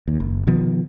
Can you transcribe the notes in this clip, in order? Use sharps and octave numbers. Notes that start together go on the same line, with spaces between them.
D#2
F#1
B2 D#3 F3 B3